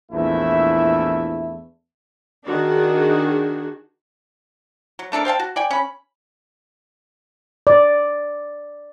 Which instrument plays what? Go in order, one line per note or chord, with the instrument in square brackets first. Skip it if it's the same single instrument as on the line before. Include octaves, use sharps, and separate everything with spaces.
[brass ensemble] A#1 E2 A3 E4 E5
[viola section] D#3 D4 F#4 G#4
[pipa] F#3
A3 D4 A4 A#4
C5 F5 G5 A5
F#4
D5 G5 G#5
C#4 B5
[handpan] D5